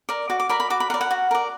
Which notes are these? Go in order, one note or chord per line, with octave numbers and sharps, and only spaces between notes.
A#4 D5
F#4 D6
D6
A#4 D5 B5
B5
F#4 D6
B5
A#4 D5 F#5
F#5
F#4
A#4 D5